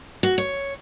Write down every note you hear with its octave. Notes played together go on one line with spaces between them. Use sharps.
F#4
C#5